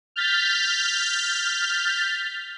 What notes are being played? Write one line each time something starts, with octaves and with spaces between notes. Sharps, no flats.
F6 G6 A6 B6